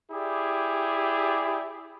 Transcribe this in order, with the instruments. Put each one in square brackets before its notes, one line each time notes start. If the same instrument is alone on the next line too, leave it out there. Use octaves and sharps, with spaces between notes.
[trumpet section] E4 G4 G#4 D5